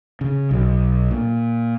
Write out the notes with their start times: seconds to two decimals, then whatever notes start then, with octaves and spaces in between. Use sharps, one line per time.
0.21 C#3
0.51 B1
1.11 A#2